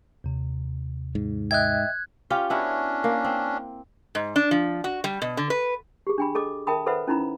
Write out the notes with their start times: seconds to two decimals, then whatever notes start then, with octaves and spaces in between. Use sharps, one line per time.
0.24 D#2 C3
1.15 G#2
1.51 D#5 E5 G5 F#6 G#6
2.30 C#4 F4 G4
2.50 B3 C#4 D4 E4 F#4
3.04 A#3
3.24 C4
4.15 G#2
4.36 D4
4.51 F3
4.84 F#4
5.04 G3
5.22 B2
5.37 D3
5.50 B4
6.07 G4 G#4
6.18 D4 G5 B5
6.35 G#4 A4 D#5 D6
6.67 A#4 E5 G5 A5 B5 D#6
6.86 A4 B4 C5 E5 F#5 B5
7.07 C#4 D#4 E4 A#5 B5